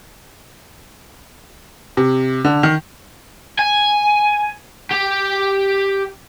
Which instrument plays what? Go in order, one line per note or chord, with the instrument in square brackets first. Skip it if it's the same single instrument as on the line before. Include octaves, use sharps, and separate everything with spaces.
[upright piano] C3
D3
D#3
[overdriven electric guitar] G#5
G4